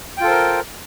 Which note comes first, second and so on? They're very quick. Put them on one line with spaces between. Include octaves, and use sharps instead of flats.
G5 F4 A4 C5 A#4